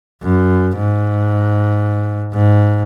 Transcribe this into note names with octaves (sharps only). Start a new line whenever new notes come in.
F#2
G#2
G#2